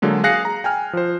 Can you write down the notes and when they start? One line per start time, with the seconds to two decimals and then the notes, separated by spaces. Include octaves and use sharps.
0.02 D3 F#3 G#3 A#3
0.24 G#4 F5 F#6 A#6 C7 C#7
0.45 A#5
0.64 G5 G#5 F6
0.93 F3 C5